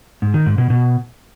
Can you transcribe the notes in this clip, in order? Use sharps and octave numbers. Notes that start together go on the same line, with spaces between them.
G#2
D#3
G#2
B2
B2